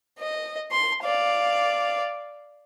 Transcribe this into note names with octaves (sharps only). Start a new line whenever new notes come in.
D#5
C6
D5 F5